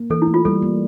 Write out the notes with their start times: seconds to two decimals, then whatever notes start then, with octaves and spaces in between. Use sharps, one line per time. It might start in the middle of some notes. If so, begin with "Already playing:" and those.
Already playing: A#3
0.10 E3 A4
0.22 E4
0.27 A3
0.34 F4
0.45 G3 A4
0.62 A#3